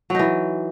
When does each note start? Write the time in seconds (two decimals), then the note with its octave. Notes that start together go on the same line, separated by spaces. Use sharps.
0.10 F#3
0.15 D#4
0.19 E3